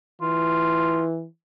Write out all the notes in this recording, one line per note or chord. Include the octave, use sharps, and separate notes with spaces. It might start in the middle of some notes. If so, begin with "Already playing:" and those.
E3 F4